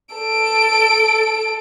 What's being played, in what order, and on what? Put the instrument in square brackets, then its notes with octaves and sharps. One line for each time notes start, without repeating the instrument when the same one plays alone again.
[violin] A4 D7